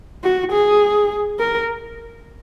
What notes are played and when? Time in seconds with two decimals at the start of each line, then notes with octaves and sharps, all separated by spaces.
0.24 F#4
0.52 G#4
1.39 A#4